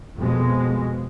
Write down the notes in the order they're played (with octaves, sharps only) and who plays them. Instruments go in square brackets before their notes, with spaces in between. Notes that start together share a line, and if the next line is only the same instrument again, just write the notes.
[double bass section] F2 B2 G#3